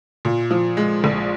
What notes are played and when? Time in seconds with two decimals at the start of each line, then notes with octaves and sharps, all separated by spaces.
0.25 A#2
0.51 F3
0.77 G#3
1.04 A#1